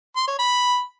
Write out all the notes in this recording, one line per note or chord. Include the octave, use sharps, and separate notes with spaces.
C6
C#5
B5